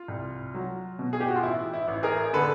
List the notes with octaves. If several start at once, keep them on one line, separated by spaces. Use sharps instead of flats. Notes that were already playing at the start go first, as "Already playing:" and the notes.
Already playing: F4
C2
F#3
B2
G#4
G4
F#4
F4
A1 E4
E4
A1
G#4 A#4
D3 A4 B4